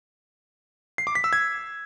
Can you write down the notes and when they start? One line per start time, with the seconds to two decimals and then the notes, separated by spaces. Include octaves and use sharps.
0.98 C7
1.07 D6
1.15 B6
1.24 E6
1.33 G#6